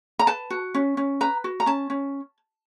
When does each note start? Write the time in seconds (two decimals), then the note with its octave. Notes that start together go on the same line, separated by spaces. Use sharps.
0.19 A#5
0.27 B4 A5
0.50 F#4
0.74 C#4
0.97 C#4
1.21 B4 A#5
1.44 F#4
1.60 A#5
1.66 C#4 A5
1.90 C#4